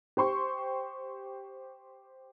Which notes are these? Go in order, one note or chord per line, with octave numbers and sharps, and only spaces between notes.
G4 C5 C6 C#6